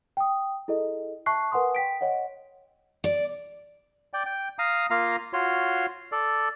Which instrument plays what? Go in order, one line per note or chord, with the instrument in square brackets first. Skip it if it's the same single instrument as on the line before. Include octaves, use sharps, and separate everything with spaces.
[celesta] G5 D#6
E4 G#4 A4 D#5
E5 A5 C#6 F#6 C7
A#4 B4 F#5 G#5 C6 D#6
G5 B6 D7
C#5 D#5 F#5
[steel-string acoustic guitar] D5
[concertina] D5 G5
G5
F5 A#5 D#6
A#3 F4 F5 A#5
F4 F#4 C#5 C6
A4 D5